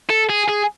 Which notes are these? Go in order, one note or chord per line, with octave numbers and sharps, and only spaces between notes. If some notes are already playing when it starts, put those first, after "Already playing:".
A4
G#4
G#4